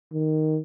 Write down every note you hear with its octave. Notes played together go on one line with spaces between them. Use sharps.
D#3